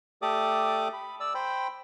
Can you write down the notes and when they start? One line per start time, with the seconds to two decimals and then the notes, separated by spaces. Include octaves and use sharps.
0.22 A3 G4 A4 D5 D6 D#6
0.93 B5
1.20 D5 E6
1.35 C5 G5 B5